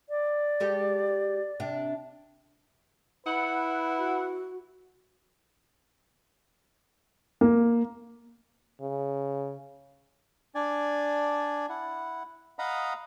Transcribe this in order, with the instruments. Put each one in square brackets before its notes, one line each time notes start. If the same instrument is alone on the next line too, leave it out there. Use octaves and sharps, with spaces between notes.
[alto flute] D5
[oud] G#3 G4 A4
C3 D4
[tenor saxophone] E4 [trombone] B4 [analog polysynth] F#5
[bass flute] F#4
[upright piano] A#3
[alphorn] C#3
[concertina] D4 D5 G#5
E4 F#5
D#5 F5 F#5 A#5 B5 D#6